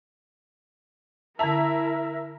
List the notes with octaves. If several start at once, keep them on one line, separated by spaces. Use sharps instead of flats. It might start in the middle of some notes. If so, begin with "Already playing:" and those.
D3 E4 A#4 E5 A5 A#5